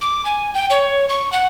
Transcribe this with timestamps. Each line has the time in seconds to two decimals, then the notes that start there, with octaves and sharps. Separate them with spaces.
0.01 D6
0.25 G#5
0.54 G5
0.70 C#5
1.09 C#6
1.32 F#5